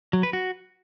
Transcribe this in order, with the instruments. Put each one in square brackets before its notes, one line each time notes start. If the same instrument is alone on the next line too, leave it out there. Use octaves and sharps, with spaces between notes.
[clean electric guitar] F#3
B4
F#4